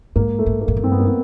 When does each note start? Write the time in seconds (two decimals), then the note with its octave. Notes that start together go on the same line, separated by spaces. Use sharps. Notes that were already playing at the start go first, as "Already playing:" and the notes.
0.16 G#2 A#3
0.39 A3
0.46 G#2
0.61 A#3
0.68 G#2
0.77 G2
0.84 C4
0.92 B3
0.99 A#3
1.07 B3